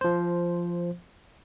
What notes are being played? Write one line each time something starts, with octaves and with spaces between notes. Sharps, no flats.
F3 C5